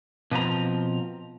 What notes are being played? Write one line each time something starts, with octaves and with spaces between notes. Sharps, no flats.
B2 F3 C4 A#5